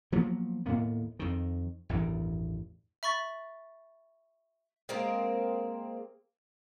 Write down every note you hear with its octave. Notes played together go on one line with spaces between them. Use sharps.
F3 F#3 A#3 B3
D#2 A2 A#3 B3
F2 D#3
A1 E2 G2 D#3
E5 B5 C#6 A6
G#3 A#3 C4 A#4